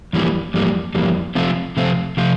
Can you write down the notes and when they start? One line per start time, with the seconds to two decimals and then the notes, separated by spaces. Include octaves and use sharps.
0.13 F2 E3 G3 A#3
0.54 F2 E3 G3 A#3
0.95 F2 E3 G3 A#3
1.35 C3 F3 A3 C4 F4
1.77 C3 F3 A3 C4 F4
2.17 C3 F3 A3 C4 F4